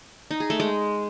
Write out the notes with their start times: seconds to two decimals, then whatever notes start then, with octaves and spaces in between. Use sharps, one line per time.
0.31 D#4
0.40 G#4
0.50 A3
0.60 G#3